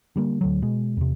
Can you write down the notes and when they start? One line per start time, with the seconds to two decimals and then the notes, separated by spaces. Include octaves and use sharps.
0.16 D3 G3 A#3
0.41 D2 D3 F#3
0.62 B2 G#3
0.97 E2 C3